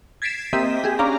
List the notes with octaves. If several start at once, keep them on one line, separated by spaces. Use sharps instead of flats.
G#6 A6 B6 C7 D7 E7
A#3 C4 G4 D#5 E5 B6
G4 G#4
C#4 D4 D5 F5 A#5